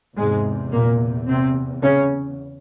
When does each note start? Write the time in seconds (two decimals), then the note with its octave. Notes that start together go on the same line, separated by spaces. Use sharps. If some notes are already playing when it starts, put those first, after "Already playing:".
0.17 E2 G#2 C3 G#3
0.72 A#2 A#3
1.28 C3 C4
1.82 C#3 C#4